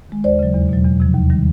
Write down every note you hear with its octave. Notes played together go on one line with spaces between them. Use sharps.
D#3 G#3
D#2 C5 D5
C#3 F#3
E2
B2 F#3
E2
C3 F3
D#2
D#3 G3